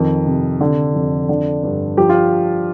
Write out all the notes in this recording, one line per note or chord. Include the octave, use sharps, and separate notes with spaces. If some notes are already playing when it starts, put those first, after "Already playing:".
Already playing: F2 D#3
C3
D3
F2
D3
G2
F3 G4
F4